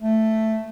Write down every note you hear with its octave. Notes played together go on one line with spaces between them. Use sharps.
A3